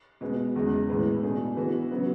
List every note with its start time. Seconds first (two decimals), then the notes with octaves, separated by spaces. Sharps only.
0.21 B2 G#3 B3
0.56 E2 C#3 G#3
0.89 A2 E3 G#3 B3
1.23 B2 A3 D4 G#4
1.56 E3 B3 F#4 B4
1.91 C#3 F#3 B3 F#4